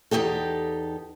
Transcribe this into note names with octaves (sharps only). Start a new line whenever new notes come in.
E2 G#2 D#4 G4 A4